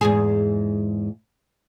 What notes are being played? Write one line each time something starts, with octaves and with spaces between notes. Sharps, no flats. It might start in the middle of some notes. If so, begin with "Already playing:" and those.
E2 G#2 G#4